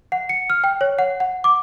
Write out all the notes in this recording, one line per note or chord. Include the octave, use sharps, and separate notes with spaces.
F#5
C#7
F6
G5
C#5
F#5
F#5
D6